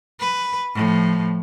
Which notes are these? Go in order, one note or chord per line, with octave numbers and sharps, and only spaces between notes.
B4
A2 F3